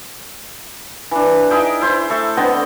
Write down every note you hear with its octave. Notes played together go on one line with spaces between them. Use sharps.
E3 D4
D#4 E4 G#4 G5
E4 C5
A3 A4 E5
D3 B3 C4 D#5